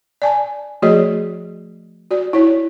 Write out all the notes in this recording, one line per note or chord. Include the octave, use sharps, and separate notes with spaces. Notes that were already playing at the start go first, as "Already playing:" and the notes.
D5 G#5 A5
F3 A3 F#4 G#4 C#5 D#5
F#4 D5
E4 C#5